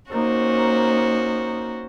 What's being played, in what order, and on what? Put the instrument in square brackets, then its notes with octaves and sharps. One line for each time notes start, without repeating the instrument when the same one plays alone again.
[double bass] A#3 D#4 [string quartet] C#4 F#4 C5